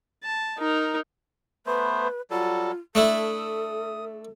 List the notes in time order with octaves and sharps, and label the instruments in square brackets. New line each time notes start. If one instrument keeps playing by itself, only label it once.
[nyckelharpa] A5
D#4 A#4
[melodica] A3 B3 C5 [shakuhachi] B4
[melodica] F#3 G3 A4 [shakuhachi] F4
[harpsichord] A3 D4 E4 [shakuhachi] A4 [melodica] D#6